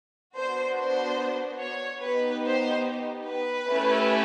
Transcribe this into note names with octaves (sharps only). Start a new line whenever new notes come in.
B3 D4 F#4 C5
C5
C#5
B3 D#4 G4 B4
C5
B4
A3 C#4 E4 G4